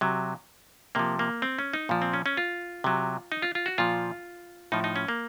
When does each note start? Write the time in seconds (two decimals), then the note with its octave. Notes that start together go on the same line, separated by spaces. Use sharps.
0.01 C3 F#3
0.95 C3 F3 A#3
1.19 A#3
1.42 C4
1.59 C#4
1.73 D#4
1.89 A#2 F3
2.02 C4
2.13 C#4
2.26 C#4
2.37 F4
2.84 C3 F#3
3.32 D#4
3.42 F4
3.55 F4
3.66 F#4
3.78 A#2 F3 F4
4.72 A2 F3 D#4
4.84 D#4
4.96 C#4
5.08 A#3